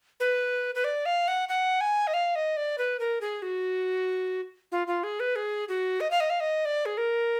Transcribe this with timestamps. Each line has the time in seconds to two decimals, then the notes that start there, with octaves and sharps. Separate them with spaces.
0.20 B4
0.75 B4
0.84 D5
1.06 F5
1.28 F#5
1.49 F#5
1.81 G#5
2.07 D#5
2.14 F5
2.35 D#5
2.57 D5
2.78 B4
3.00 A#4
3.21 G#4
3.42 F#4
4.72 F4
4.87 F4
5.04 G#4
5.20 B4
5.36 G#4
5.69 F#4
6.01 D#5
6.11 F5
6.20 D#5
6.30 F5
6.40 D#5
6.65 D5
6.86 G#4
6.98 A#4